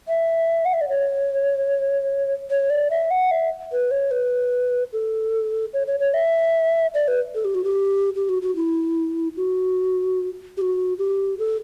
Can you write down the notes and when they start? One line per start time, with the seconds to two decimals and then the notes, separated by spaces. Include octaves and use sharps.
0.08 E5
0.65 F#5
0.74 E5
0.81 D5
0.89 C#5
2.50 C#5
2.70 D5
2.90 E5
3.11 F#5
3.31 E5
3.72 B4
3.91 C#5
4.11 B4
4.93 A4
5.74 C#5
5.87 C#5
6.00 C#5
6.14 E5
6.94 D5
7.08 B4
7.35 A4
7.45 G4
7.55 F#4
7.64 G4
8.15 G4
8.29 F#4
8.42 F#4
8.56 E4
9.37 F#4
10.57 G4
10.61 F#4
10.98 G4
11.39 A4